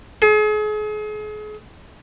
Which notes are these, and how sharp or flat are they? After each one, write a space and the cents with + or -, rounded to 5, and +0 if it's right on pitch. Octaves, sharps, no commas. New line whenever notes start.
G#4 +40